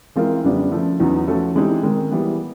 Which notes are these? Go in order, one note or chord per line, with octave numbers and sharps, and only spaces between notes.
E3 G#3 C4 F4 A#4
F#2 D3 G3 B3 D4
C#3 F3 A3
E2 C#3 F#3 B3 D#4
F3 A3 C#4 F#4 A4
E3 G#3 C4 D#4 G4
D#3 G#3 C4
E3 G3 B3